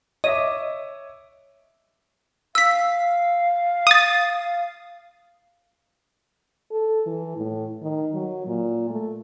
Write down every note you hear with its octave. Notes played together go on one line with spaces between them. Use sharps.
C#5 D#5 E5 D6
F5 E6 B6
D#6 A6
A4
E3
A2
D#3
F#3
A#2
A3